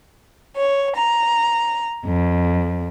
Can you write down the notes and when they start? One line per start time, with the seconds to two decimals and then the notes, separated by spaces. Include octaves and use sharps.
0.56 C#5
0.95 A#5
2.05 F2